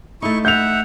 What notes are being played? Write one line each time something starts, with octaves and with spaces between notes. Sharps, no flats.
A3 D#4 E4 C#6
E5 F#5 G6 F7